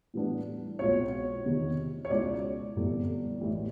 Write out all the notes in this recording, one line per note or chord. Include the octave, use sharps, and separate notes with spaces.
A2 E3 G3 B3 D4
B1 B2 G#3 C4 F4 C#5
E2 C3 D#3
C#5
C#2 B2 G#3 C#4 E4 D5
G1 G2 E3 A3 C4
A1 A2 E3